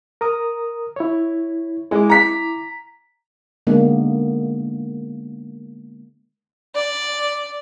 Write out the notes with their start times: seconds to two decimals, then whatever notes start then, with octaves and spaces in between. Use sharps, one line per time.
0.21 A#4 A#5 D#6
0.96 E4 C#5
1.91 G#3 E4 D6
2.10 A#5 B6
3.67 D3 G#3 A#3 B3 D4 D#4
6.75 D5